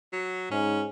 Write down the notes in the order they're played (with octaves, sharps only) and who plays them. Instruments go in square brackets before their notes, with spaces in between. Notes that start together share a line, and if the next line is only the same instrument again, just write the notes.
[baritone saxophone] F#3
[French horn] G#2 [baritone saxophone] C#4